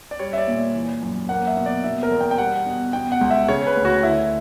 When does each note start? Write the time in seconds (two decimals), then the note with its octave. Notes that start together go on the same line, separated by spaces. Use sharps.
0.11 D5
0.19 G3 C#5
0.33 E5
0.38 D5
0.48 A#2
0.74 E3
1.03 F#2
1.29 A#3 F#5
1.47 E5
1.57 B2
1.66 D5
1.84 B2 E5
2.03 A#4
2.11 E2
2.21 G5
2.31 G5
2.38 G3 F#5
2.67 B2
2.93 B2 G5
3.12 F#5
3.21 C#2
3.31 E5
3.48 C#3 C#5
3.67 B4
3.76 D2
3.85 F#4
4.03 D3 E4